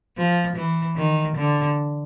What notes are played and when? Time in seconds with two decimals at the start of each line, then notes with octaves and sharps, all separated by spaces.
0.17 F3
0.56 E3
0.96 D#3
1.36 D3